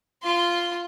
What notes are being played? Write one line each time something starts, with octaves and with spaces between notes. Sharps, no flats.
F4 C6